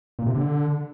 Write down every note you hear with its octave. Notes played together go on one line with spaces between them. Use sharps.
A#2
C3
D3